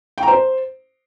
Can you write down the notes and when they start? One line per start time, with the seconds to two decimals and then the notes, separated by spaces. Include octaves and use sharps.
0.18 G5
0.23 A#5
0.28 C5